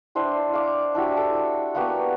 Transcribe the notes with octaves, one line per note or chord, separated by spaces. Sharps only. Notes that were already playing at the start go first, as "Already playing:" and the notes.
D4 E4 C5 G5
F5 D6
D4 E4 F#4 G4
A4
A#3 B3 F#4 G4